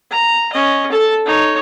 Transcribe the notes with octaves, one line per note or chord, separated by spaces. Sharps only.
A#5
C#4 D#5
A4 A5
D#4 C#5